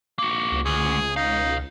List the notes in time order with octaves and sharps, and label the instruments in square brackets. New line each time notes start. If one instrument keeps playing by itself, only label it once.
[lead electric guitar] A#3 F#4
[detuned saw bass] C#2
[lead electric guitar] D2 [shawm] G#4
[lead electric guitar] B2 F5 [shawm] D#4